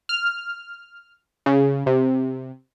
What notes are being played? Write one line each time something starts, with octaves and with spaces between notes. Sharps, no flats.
F6
C#3
C3